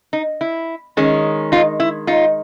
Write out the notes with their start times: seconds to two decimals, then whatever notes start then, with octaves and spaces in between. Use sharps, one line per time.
0.13 D#4
0.41 E4
0.97 D#3 G#3 C#4
1.52 D#4 F4
1.80 E4
2.07 D#4 F4